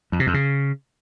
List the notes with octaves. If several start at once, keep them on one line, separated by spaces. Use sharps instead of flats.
F2
C3
F2
C#3